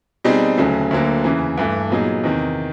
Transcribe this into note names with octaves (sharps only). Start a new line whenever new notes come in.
B2 G3 C4 D#4 G#4
D2 C#3 F#3 A3
D2 D3 F#3 A#3
E2 C#3 E3
G2 E3 A3
A#2 F#3 B3 D#4 G#4
E2 C3 D#3